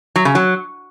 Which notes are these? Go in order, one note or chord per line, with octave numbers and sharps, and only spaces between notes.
F#3
C#3
F#3